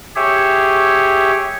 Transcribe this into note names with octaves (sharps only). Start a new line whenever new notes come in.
G4 G#4 C#5 E5